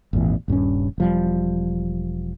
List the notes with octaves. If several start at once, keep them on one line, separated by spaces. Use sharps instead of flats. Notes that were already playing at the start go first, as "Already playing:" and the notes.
G#1 E2 A#2 E3
D#1 G2 C4 C#4
E1 F3 G3